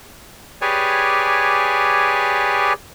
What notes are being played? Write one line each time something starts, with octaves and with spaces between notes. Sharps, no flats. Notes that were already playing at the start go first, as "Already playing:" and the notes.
G4 G#4 B4 C#5 D5 G#5